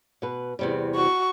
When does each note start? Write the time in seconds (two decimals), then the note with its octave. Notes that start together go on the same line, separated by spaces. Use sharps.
0.22 B2 B4
0.59 E2 C3 G3
0.95 F#4 C#6